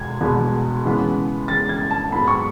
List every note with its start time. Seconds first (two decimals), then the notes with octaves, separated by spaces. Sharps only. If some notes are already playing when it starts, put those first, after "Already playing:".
Already playing: E2 B2 G#3 B3 G#6
0.21 E2 B2 G#3 B3
0.85 C#3 E3 G#3 B3
1.48 C#3 E3 G#3 B3 A6
1.69 G#6
1.91 A5
2.12 G#2 F#3 B3 B5
2.28 C#6